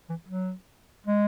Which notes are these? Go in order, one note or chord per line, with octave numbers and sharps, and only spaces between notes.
E3
F#3
G#3